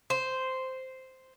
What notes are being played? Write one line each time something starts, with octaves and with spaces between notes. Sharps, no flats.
C5